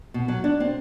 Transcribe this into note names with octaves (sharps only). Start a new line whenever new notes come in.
B2
F#3
D4
C4